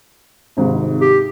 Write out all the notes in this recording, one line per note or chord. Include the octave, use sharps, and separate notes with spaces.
G#1 G#2 C3
G4